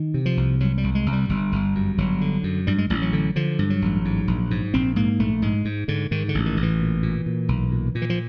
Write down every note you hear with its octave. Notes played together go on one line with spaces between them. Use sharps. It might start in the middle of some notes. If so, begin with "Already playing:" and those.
Already playing: D#3
C3
F3
C2
C2 F#3
G3
C2
G#3
C2
G3
G1
G1
F#2
G1 F#3
D3
F#2
G2 G3
G#3
A1 G3
F#3
D3
D3 F3
G2
F#3
A1
G#2
A#1
G#2
A#1 C4
G#2 A#3
A#1 A3
G#2 G#3
G#2
G#2 D3
G#2 D#3
D3
A1
D#3
A1
E3
A#2
A#2
A#2
B1
A#2
A#2
E3
F3